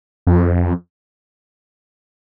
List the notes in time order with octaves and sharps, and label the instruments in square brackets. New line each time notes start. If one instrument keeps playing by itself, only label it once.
[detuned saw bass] F2